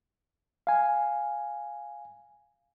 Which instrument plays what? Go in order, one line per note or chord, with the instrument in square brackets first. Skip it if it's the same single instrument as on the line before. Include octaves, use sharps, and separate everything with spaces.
[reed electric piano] F5 G#5